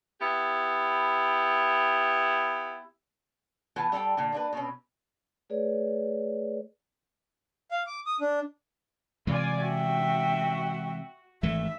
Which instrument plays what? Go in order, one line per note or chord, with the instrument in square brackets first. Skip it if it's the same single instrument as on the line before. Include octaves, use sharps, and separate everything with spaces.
[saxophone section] B3 E4 G4
[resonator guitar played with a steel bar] E3 B3 E4 F4 A5
G3 E4 A4 C5 G5
A#2 D3
A#3 D4 B4
B2 C4 C#4
[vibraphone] A3 G#4 B4 C#5 D5
[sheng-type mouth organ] F5
D6
D#6
D4
[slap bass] C3 E3 G#3 [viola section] F4 D5 G#5
[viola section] F#4 [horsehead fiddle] E5 G5
[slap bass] G#1 E3 A3 [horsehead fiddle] E5